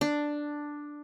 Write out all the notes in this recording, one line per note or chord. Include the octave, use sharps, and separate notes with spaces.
D4